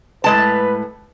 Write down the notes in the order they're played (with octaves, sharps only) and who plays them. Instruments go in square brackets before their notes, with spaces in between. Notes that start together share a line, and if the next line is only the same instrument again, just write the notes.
[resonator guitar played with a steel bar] A2 G#3 A5 [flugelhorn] B4